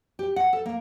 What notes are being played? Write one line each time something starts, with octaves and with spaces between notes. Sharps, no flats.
G4
F#5
A4
A#3